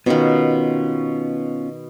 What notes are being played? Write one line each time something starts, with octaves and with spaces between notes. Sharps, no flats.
B2 D#3 B3 C#4 F4